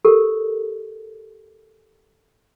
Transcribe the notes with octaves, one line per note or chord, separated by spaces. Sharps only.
G4 A4 A#4